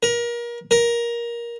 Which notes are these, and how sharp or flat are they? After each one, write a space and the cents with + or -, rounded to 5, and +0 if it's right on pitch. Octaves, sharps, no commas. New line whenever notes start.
A#4 +30
A#4 +15